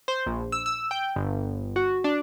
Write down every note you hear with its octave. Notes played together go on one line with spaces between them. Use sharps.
C5
A#1
E6
E6
G5
G1
F#4
D4